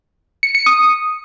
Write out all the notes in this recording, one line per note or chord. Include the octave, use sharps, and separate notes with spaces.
C#7
C#7
D#6